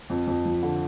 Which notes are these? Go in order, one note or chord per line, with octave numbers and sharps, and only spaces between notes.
F2
F2
F3
D3